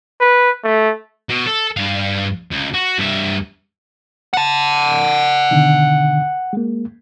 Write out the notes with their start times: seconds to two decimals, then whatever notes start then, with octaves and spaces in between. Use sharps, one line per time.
0.20 B4
0.63 A3
1.29 B2
1.46 A4
1.77 G2 F5
2.51 C#2
2.74 F#4
2.98 G2 E5
4.33 F#5 A5
5.51 B2 D3 D#3
6.53 G#3 A#3